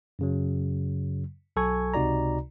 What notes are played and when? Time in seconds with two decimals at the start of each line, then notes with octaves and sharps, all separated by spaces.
0.19 F#2 C#3 F#3
1.56 B1 F#3 A4 G#5 C#6 G#6
1.94 C#2 C3 D#4 F#4 D5 A#5